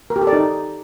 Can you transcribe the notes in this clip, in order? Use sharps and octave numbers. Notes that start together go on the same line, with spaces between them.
A#4
G4
A4
D5
D#4